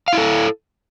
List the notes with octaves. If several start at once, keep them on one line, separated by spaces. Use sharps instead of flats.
E4 A4 F5